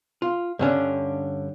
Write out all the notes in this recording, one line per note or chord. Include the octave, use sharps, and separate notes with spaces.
F4
G2 D3 C#4 D4